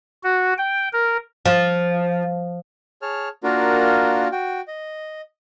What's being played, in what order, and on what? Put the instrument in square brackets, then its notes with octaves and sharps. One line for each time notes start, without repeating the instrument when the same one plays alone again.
[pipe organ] F#4
G5
A#4
[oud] F3
[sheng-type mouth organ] G#4 C#5 A5 F6
A#3 D4 F4 F#4 A#4
F#4 G5
D#5